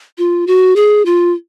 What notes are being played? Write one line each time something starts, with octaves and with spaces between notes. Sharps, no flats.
F4
F#4
G#4
F4